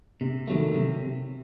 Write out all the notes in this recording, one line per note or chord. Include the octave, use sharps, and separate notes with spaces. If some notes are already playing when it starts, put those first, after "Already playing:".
C3
D#3 F#3 A3
C3